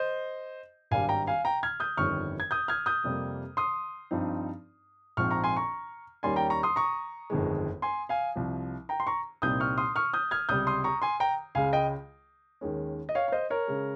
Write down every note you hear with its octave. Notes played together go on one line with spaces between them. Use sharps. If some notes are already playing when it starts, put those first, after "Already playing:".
Already playing: C5 D#5
G#1 G2 G3 F5 G#5
G5 A#5
F5 G#5
G5 A#5
F6 G#6
D#6 G6
G1 F2 D#3 G3 C#4 C#6 F6
G#6
D#6 G6
F6 G#6
D#6 G6
F2 C3 G3 A#3
C6 D#6
G2 F3 C4 D#4
A#1 G#2 F3 C4 C#6 F6
A#5 C#6
G#5 C6
A#5 C#6
D#2 D#3 G3 A#3 C#4 G#5 C6
G5 A#5
A#5 C#6
C6 D#6
A#5 C#6
G1 F2 D#3 G#3
G#5 C6
F5 G#5
C2 C3 F3
G5 A#5
C6
A#5 C#6
C2 A#2 G3 C4 D#4 D#6 G6
C#6 F6
C6 D#6
C#6 F6
D#6 G6
F6 G#6
C#2 C3 G3 D#6 G6
C6 D#6
A#5 C#6
G#5 C6
G5 A#5
C#2 C#3 G#3 F5 G#5
D#5 G5
D#2 D#3 G#3 C#4
D#5
C#5 F5
F5
C5 D#5
A#4 C#5
C#3 G#3